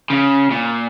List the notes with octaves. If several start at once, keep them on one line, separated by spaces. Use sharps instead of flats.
C#3
A#2